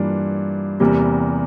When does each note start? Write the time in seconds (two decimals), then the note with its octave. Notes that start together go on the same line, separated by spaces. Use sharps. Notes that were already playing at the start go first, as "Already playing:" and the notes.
Already playing: G2 E3 A#3 D4 F4
0.80 E2 C3 G3 A#3